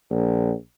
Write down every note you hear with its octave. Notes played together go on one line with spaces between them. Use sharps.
A#1